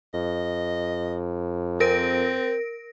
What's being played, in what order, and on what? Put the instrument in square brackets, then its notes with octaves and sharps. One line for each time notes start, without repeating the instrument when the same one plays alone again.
[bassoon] F2 [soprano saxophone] D#5
[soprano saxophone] C4 [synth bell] A#4 A#6 D7